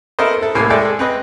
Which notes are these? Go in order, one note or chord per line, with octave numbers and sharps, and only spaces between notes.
B3 E4 A4 A#4 C5 D#5
E4 A4
C2 A2 A3 A#3 G#5
G#3 G#4 A4 D5 E5 G5
C4 B4 D#5